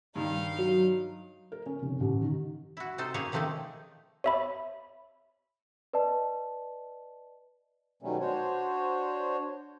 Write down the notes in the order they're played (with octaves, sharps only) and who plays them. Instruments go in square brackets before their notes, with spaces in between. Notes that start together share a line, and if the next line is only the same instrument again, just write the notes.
[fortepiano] G2 D#3 [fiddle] D#4 F5
[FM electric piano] F#3
[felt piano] A#4
C#4
F1
A1
D#3
[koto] E4 F#4
C3 D#4 A4 C5
A#3 C#4 D#4 G#4 C#5
C3 D#3 F3 A3 A#3 D#4
[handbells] C#5 E5 B5
[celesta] B4 D5 D#5 A5
[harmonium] B2 D#3 F#3 G3 A3 C#4
D4 F#4 C5 C#5